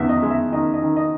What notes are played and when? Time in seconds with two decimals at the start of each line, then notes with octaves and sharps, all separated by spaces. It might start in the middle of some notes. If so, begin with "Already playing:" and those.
Already playing: E2 D#3 E5
0.09 D#5
0.23 G#3
0.30 E5
0.52 D#3 D#5
0.74 D#5
0.82 D#3
0.96 D#5